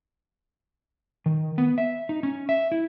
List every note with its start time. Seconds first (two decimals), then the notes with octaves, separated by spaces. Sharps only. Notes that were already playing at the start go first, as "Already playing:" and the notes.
1.26 D#3
1.58 B3
1.78 E5
2.09 D#4
2.23 C#4
2.49 E5
2.72 E4